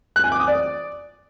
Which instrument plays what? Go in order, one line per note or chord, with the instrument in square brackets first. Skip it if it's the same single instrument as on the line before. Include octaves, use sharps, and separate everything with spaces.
[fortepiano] F#6
G#5
D6
D#6
D5